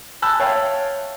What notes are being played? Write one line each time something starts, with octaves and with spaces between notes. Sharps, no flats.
G#5 A5 B5 E6 F#6 G6
C#5 E5 F5 G5 A5